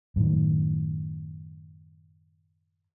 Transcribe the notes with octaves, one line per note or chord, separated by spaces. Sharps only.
F#2 A2 D#3